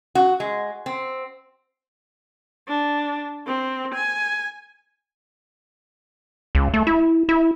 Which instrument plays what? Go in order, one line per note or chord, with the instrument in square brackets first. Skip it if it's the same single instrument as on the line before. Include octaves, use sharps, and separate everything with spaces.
[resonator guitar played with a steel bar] F#4
G#3
C4
[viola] D4
C4
G#5
[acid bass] C#2
A3
E4
E4